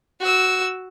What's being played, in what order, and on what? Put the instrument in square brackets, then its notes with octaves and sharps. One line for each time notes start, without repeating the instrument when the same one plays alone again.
[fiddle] F#4 E6